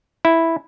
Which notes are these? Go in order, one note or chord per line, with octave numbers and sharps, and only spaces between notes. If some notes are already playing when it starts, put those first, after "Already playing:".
E4